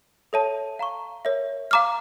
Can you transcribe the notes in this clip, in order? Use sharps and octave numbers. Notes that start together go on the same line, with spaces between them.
A4 C#5 E5 A5
F5 A#5 C#6
A#4 C#5 E5
F5 A#5 D6 F6